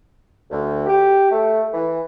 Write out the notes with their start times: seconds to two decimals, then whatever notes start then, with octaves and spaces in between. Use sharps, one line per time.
0.51 D2
0.87 G4
1.30 A3
1.73 E3